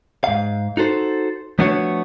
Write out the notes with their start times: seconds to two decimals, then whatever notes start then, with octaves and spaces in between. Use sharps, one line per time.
0.24 G#2 F5
0.77 D#4 F#4 A4 C5
1.59 F3 A3 B3 D4 F#4 C#5